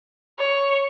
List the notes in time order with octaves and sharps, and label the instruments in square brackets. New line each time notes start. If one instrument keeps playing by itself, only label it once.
[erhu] C#5